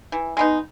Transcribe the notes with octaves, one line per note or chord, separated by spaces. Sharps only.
E3
G#3 B3 D#4